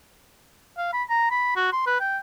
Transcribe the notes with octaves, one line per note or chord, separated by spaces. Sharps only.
F5
B5
A#5
B5
F#4
C6
B4
G5